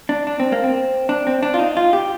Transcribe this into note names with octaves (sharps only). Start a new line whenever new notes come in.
D4
D4
C4
A#3
C4
D4
C4
D4
F4
D#4
F4
G4